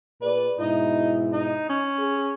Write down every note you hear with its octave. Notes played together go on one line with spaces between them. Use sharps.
A#2 G#4 B4 D5
G#2 B2 D#4 E4
D#4
C#4
G#4